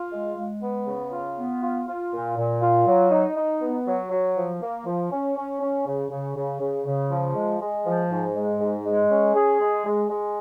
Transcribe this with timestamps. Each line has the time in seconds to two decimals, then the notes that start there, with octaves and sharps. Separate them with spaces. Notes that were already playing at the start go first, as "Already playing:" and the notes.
Already playing: F4
0.11 G#3
0.36 G#3
0.62 B3
0.87 C#3
1.12 F4
1.37 B3
1.62 F4
1.87 F4
2.12 A#2
2.36 A#2
2.61 F4
2.87 F#3
3.11 D#4
3.36 D#4
3.61 B3
3.87 F#3
4.11 F#3
4.36 F3
4.62 A#3
4.86 F3
5.11 C#4
5.37 C#4
5.61 C#4
5.86 C#3
6.10 C#3
6.36 C#3
6.60 C#3
6.86 C#3
7.11 F3
7.35 G#3
7.61 G#3
7.85 F3
8.10 G#2
8.35 G#3
8.60 G#2
8.85 G#3
9.10 C#4
9.35 G#4
9.60 G#3
9.85 G#3
10.10 G#3